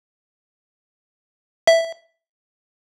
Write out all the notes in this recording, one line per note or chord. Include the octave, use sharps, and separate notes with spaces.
E5